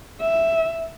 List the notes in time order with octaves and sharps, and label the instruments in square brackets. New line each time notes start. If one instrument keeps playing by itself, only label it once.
[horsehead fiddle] E5